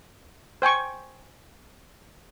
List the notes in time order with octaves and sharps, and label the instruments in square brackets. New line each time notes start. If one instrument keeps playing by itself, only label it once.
[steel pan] C5 G5 G#5 C#6